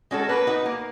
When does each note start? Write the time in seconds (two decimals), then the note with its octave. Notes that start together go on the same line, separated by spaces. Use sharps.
0.11 G#3 C#4 F#4 A4
0.29 A#3 B4
0.47 D#4 F#4 B4
0.66 A#3